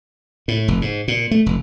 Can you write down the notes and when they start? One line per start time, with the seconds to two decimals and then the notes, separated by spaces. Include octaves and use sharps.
0.48 A2
0.68 F1
0.82 G#2
1.08 A#2
1.31 A3
1.46 F1